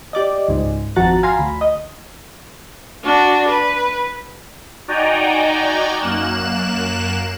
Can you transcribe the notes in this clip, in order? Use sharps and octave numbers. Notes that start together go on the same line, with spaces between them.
G4 D5 D#5
C#2 G#2
G#1 F2 F#4 A#5 F#6 A6
F5 G#5 A#5 C6 A#6
D2 B5
D#5
D4 F#4
B4
D#4 F#4 D5 G5 G#5 A#5
F#2 A#3 F#6 E7